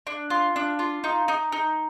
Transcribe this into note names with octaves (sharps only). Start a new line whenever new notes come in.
D4
F4
D4
F4
D#4
D#4
D#4